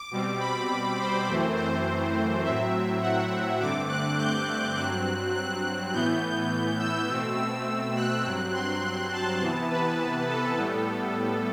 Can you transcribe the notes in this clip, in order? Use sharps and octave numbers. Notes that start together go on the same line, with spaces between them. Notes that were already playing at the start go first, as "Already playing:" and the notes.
Already playing: D6
B2 G3 C4
B5
C5
F#2 E3 A3 C4
C5
A2 F#3 C4 E5
F#5
G2 D3 A3 C4 D6
F#6
G6
G2 F#3 C4 F#6
F#6
A2 E3 B3 G6
E6
B2 A3 C4
E6
F#6
G2 F#3 C4
C6
A5
C3 E3 B3
B4
A4
A2 G3 B3